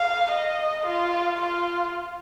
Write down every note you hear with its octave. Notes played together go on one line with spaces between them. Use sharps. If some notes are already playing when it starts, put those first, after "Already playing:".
Already playing: F5
D#5
F4
F4